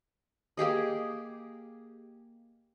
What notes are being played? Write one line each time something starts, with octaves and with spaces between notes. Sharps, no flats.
A#3 G4 G#4 D#5